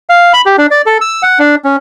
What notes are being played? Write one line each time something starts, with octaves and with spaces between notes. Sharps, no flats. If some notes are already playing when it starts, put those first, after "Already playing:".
F5
B5
G4
D4
D5
A4
E6
F#5
D4
C#4